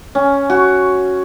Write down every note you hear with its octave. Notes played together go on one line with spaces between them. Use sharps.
C#4
F#4